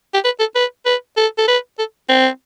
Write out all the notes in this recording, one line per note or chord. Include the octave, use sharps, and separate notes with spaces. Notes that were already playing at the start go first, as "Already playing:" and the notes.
G4
B4
A4
B4
B4
A4
A4
B4
A4
C4